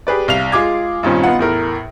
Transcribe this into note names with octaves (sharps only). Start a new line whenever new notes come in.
G4 G#4 B4 D5
C2 F5 F7
G#3 F4 G#4 D6 G#6
G2 A#2 D#3 C4 C#4
B3 D#4 F4 F#5
E2 A2 A#4